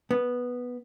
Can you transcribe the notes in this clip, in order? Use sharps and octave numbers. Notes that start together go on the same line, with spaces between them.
B3